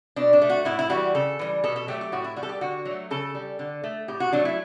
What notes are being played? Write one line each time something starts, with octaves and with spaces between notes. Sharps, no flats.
B2 D4
D4
A3
F#4
A2 E4
E4
E3 G3 F#4
C#3 A4
E3 G3
B2 A4
A4
F#3 A3 G4
G4
A2 F#4
E4
G3 F#4
A4
G4
D3 F#4
F#3 A3
C#3 A4
G3
D3
A3
A2 G4
F#4
F#3 A3 D4
E4